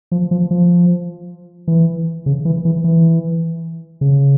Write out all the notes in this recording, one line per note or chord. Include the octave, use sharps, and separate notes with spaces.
F3
F3
F3
E3
C#3
E3
E3
E3
C#3